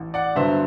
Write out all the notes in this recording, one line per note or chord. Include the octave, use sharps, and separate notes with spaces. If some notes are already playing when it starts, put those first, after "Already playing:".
Already playing: A1
D5 F#5
G2 D3 F#3 B3 C5 E5